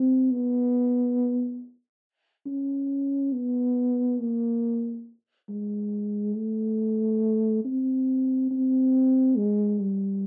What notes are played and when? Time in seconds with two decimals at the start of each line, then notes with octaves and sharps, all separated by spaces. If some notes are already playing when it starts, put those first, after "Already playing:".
Already playing: C4
0.31 B3
2.46 C#4
3.33 B3
4.19 A#3
5.49 G#3
6.35 A3
7.65 C4
8.51 C4
9.37 G#3
9.80 G3